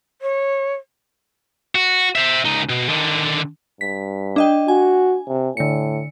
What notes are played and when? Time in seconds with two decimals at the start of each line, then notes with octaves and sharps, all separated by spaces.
0.22 C#5
1.75 F#4
2.15 C5 E5
2.45 C#2 D#4
2.69 B2
2.89 D3 D#3
3.81 G2 B6
4.36 D4 D#5 G5
4.68 F#4 G#5
5.27 C3
5.57 A2 D3 C#7